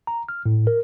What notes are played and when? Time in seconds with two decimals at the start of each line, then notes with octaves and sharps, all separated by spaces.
0.07 A#5
0.29 F6
0.46 A2
0.67 A#4